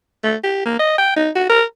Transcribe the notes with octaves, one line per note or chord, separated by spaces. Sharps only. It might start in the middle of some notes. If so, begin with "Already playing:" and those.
A3
G4
A#3
D#5
G5
D#4
F#4
A#4